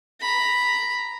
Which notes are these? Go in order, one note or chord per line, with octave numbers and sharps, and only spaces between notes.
A#5 B5